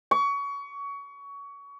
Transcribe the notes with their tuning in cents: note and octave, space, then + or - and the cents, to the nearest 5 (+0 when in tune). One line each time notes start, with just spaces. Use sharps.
C#6 +25